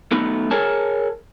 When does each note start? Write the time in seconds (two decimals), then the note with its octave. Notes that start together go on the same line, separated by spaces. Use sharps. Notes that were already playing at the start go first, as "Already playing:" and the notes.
0.11 A3 B3 D#4
0.51 G#4 A#4 C#5 G#5 A5